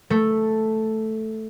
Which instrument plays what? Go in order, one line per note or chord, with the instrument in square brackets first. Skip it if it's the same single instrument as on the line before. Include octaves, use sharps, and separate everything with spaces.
[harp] A3